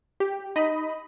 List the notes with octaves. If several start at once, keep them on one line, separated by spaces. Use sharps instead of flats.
G4
D#4 D#5 B5